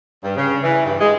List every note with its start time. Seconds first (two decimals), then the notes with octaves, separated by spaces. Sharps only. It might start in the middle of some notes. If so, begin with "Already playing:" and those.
0.24 G2
0.37 C#3
0.63 E3
0.84 G2
1.00 G#3